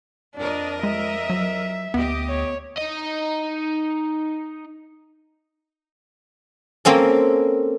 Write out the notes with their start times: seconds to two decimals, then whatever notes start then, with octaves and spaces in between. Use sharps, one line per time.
0.36 F2 D4 A#4 D#5
0.83 G#3 E5
1.30 F#3
1.94 D2 B3 G4 D#5
2.29 C#5
2.78 D#4 D#5
6.85 A#3 C4 C#4 A4